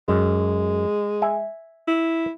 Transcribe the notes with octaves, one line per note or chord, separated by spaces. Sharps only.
F#2 G#3
E5 G#5
E4